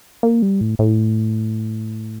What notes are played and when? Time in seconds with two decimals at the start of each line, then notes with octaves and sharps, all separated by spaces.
0.23 A#3
0.42 G3
0.61 A2
0.79 A2